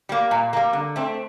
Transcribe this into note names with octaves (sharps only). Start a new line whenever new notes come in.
G3 A#3
A#2
G3 A#3
D3
A3 C4